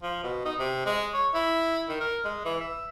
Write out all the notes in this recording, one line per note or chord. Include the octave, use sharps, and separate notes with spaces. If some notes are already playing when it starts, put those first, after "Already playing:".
F3
B2
D#4
C3
G#3
C#5
E4
D#3
A#4
G#3
E3
E5